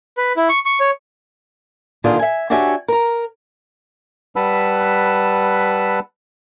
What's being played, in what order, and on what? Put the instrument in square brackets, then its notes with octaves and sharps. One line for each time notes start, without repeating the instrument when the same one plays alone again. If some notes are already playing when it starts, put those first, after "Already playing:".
[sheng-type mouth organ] B4
E4
C#6
C#6
C#5
[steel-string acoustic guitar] A#2 D3 D#3 D4 F4 G#4
E5 G#5
D4 F#4 G4 C#5 E5 G#5
A#4 A#5
[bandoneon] G3 B4 F#5 A5 B5 E6